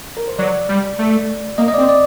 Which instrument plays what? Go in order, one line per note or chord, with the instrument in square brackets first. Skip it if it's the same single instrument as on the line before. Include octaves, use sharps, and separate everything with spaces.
[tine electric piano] A#4
C5
[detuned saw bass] F#3 [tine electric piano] D5
[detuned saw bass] G3
A3
[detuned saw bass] A#3 [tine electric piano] D#5
[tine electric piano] D#5
[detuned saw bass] C4 [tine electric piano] D5
[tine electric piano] D5